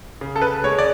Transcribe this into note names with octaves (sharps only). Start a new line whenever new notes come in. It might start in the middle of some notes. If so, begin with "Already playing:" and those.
C#3
A4
B4
G#3 C#5
D5